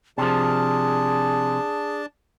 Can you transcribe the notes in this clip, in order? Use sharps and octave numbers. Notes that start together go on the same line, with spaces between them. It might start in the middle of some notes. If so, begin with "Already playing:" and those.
C3 F3 D4 G#4 A5